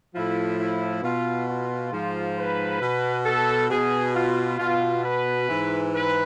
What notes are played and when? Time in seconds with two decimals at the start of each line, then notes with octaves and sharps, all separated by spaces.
0.14 A2 F3 E4
0.59 E4
1.03 B2 F4
1.48 F4
1.92 G#2 F3
2.37 B4
2.81 B2
3.26 A4
3.70 B2 G#4
4.15 F4
4.59 B2 F4
5.04 B4
5.49 G#2 E3
5.93 B4